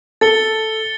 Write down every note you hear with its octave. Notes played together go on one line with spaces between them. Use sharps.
A4 A6 C#7 G7